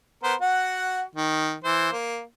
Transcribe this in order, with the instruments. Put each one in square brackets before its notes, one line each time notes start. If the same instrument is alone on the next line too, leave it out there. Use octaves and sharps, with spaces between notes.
[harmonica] B3 A#4 C5
F#4 F#5
D#3
E3 C5
A#3